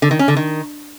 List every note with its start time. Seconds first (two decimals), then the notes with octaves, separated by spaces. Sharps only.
0.02 D3
0.11 D#3
0.19 C#4
0.28 D3
0.37 D#3